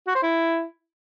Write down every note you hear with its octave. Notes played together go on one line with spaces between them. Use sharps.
F#4
C5
E4